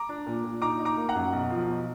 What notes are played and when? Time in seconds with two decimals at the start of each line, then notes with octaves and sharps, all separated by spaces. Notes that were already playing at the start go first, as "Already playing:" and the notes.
Already playing: A#5 D6
0.09 D4
0.27 A#2
0.44 A#2
0.62 D#4 A#5 D6
0.80 D#4
0.85 A#5 D6
0.97 A#3
1.09 F#5 A#5
1.15 F#2
1.33 B1
1.50 F3
1.68 B1